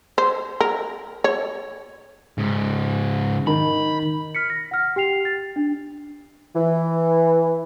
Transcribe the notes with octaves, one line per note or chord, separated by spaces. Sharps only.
C5
A#4
C#5
G#2 C#3
D#3 B5
F6 B6 C#7
A#6
F#5 F6
G4 G5 C7 F7
A6
D4
E3